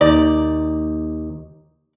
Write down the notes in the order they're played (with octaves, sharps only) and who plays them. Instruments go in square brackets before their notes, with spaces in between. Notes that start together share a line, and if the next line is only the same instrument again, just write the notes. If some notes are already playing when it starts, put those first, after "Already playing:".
[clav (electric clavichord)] D#2 D#4 A#5 [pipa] D5